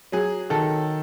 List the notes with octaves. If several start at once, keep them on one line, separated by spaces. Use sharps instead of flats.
F#3 G#4
D#3 A4